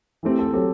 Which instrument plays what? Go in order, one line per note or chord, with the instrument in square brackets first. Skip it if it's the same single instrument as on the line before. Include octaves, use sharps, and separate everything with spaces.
[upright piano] E3 A3 C4 G4
[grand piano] A4
[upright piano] F#3 C4 G4 [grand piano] A4